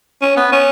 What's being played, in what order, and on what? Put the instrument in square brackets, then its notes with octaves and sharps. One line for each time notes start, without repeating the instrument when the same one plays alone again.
[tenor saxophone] C#4
B3
C#4